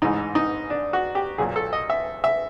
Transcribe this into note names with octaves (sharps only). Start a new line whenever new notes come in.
A1 G#2 E3 D#4
D#4
D4
F#4
G4
B1 A#2 F#3 G#4
A4
D#5
E5
E5